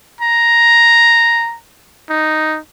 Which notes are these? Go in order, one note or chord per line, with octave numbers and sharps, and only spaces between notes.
A#5
D#4